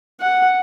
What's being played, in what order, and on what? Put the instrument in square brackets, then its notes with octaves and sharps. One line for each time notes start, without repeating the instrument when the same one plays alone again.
[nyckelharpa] F#5